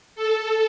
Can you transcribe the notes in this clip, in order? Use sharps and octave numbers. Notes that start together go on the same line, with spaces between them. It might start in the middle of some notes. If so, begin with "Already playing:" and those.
A4